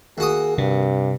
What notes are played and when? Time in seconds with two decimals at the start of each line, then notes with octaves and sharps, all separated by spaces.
0.18 D#2 F#4 G#4 D#6
0.58 G2 C3